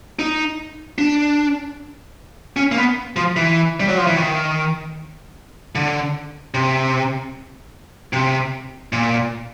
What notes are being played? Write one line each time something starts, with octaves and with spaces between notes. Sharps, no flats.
D#4
D4
C#4
A#3
B3
F3
E3
G3
F#3
F3
E3
D#3
D3
C3
C3
A#2